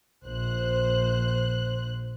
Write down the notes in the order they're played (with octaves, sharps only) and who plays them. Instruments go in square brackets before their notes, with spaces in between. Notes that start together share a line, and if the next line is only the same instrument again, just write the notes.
[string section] A#1 C5 F#6